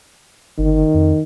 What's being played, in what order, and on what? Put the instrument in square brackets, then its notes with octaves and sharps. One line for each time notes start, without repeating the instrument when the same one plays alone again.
[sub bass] G1 [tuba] D#3
[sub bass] F2